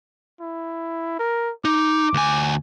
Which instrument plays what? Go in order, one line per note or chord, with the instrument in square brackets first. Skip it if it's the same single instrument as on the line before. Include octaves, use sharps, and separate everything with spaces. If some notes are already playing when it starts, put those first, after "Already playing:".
[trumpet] E4
A#4
[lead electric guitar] D#4 [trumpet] D6
[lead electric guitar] D2 G#5